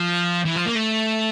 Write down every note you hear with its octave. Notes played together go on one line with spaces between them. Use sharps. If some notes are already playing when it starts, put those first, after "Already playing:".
Already playing: F3
E3
F3
A#3
A3